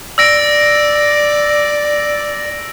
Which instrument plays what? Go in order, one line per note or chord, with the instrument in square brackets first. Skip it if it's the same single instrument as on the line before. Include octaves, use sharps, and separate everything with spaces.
[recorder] D5 [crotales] E6 A#6 D7